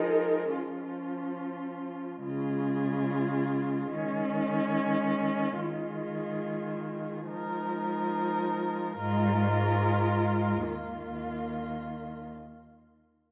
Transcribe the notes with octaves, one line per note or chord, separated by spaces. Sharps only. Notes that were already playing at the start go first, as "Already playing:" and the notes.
Already playing: F3 G#3 D#4 A#4
F3 C#4 F4
C#3 G#3 F4 G#4
D#3 G#3 C#4
D#3 G#3 F4 G#4
F3 G#3 D#4 A#4
G#2 G#3 F4 A#4
D#2 D#3 A#3 F4